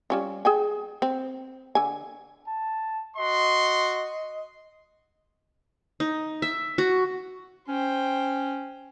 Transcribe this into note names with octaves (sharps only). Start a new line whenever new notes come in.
G3 C#4 F4
G#4 G5 G#5
C4
D3 G#5
A5
F#4 D#5 C6
D#4
E5
F#4
C#4 C5 G5